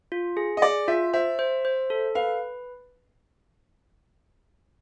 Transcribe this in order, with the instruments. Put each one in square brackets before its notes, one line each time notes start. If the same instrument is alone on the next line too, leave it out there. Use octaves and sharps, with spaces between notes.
[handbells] F4
G#4
[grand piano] D#5
[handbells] G#4 [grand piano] D5
[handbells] F4 [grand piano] E5
[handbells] C5 [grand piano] E5
[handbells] C5
C5
A4
[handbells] B4 [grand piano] F5